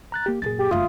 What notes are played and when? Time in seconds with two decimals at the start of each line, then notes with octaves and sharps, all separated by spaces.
0.12 A#5 F#6 A6
0.26 A#3 G4
0.42 F#2 A#2 G#4 A6
0.59 G4
0.71 F#1 G2 A3 F4 E5 D#6